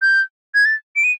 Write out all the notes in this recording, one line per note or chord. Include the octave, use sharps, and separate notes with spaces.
G6
G#6
A6
D7
D#7